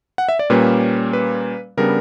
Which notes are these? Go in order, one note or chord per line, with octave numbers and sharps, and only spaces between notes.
F#5
E5
D5
A#2 G3 A#3 C#4 B4
B4
C#3 G3 B3 D4 A#4